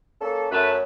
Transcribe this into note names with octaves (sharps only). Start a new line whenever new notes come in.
A#3 C#4 A4
F#2 A3 B4